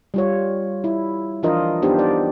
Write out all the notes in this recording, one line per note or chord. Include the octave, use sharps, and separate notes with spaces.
G3 F4 C#5
E4
E3 F3 D4 F4 A#4 D#5
B3 D4 D#4 G4 C5
D5